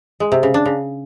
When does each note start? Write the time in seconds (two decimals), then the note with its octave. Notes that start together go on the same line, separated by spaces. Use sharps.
0.20 G#3
0.32 C3
0.43 C#3
0.54 D4
0.66 C#3